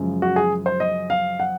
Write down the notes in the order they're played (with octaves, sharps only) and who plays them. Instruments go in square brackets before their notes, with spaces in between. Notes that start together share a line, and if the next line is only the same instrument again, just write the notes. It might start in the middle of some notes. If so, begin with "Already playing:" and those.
Already playing: [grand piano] F#2 C#3 F3 G#3
F#4
G#4
C5
D#5
F5
F#5